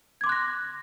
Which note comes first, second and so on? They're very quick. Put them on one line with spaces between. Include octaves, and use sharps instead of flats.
G#6 D6 C6 F#6 A#6